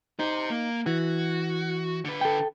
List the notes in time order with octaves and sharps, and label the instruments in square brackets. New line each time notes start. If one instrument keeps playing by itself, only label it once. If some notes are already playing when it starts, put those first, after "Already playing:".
[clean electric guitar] D#4 [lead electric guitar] G4 C5
[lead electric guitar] A#3
[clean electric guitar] E3 [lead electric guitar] F#4
[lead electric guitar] D3 B4
[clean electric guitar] A4 G5